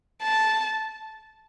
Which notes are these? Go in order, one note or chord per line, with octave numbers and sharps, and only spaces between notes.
A5